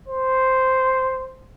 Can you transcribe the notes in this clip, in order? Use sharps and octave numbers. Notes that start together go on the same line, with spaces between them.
C5